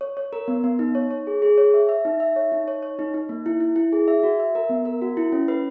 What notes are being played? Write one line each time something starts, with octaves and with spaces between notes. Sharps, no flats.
C#5
C#5
A#4
B3
B3
D#4
C#5
C#5
G#4
G#4
C#5
E5
E5
D#4
E5
C#5
D#4
C#5
C#5
D#4
D#4
A#3
E4
E4
E4
G#4
E5
F#4
E5
A#4
B3
A#4
F#4
E4
C#4
B4